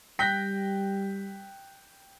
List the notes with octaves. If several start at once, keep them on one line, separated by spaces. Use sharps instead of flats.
G3 G5 F#6 G6 A#6 B6